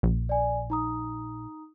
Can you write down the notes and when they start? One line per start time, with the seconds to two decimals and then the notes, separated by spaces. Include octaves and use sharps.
0.03 A#1
0.29 D5 G#5
0.70 D#4 A#5 D#6